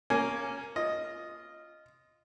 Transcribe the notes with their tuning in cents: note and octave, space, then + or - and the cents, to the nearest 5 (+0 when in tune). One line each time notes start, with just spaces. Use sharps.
A#3 +0 C#4 +0 G#5 +5
F4 -10 D#5 +0